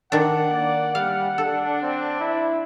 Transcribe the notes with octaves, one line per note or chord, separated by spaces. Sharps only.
D#3 D4 F#5
A#3 D5
G3 F5
D4 A4
C4
E4